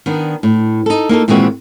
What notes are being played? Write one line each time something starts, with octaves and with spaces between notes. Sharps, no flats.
D#3 B3 D4
A2
D#4 A4
A#3 D#4 F4 A4
A#2 D#3 E3 G#3 C4 F#4